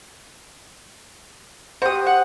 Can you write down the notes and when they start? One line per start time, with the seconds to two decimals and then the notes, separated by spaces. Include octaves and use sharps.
1.82 F#4 G4 C5 D#6
2.07 F#5